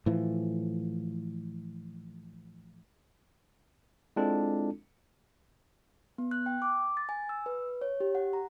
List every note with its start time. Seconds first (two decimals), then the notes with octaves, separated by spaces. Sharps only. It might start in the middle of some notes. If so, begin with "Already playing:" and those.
0.06 A2 E3 F3
4.16 G#3 C4 D4 E4 F4 A4
6.18 B3
6.31 F#6
6.46 G5
6.62 D6
6.97 A6
7.09 G#5
7.29 E6
7.46 B4
7.81 C#5
8.00 G4
8.15 F#5
8.33 A#5